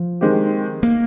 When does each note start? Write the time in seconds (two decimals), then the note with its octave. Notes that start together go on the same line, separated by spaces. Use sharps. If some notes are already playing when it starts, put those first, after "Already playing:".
Already playing: F3
0.21 D#3 G#3 C4 G4
0.83 A#3